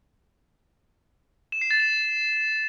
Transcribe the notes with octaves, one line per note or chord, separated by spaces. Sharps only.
E7
C7
A6
E7